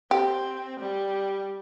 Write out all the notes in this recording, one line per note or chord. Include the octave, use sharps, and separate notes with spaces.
C4 G4
G3